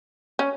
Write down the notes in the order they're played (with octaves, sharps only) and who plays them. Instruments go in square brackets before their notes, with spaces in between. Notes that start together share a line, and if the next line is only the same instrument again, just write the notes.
[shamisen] C#4